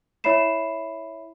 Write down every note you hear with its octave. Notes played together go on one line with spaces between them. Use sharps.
E4 C#5 E5 B5 C7 E7